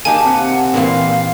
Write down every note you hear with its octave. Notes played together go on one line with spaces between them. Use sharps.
A#3 D#4 G4 G#5 A5
C3 F#5
A#2 E3 C4 F5